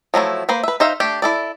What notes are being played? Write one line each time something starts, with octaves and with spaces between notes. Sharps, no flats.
F3 F#3 A3 E4
A#3 B4 C5
B4 E5
D#4 C5 E5 F5
A3 D4 G4 G5
E4 A4 D5